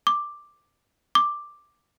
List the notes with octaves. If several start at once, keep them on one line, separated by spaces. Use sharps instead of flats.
D6
D6